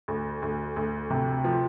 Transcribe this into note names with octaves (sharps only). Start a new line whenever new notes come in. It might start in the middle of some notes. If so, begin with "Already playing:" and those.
D2
D2
D2
C3
F3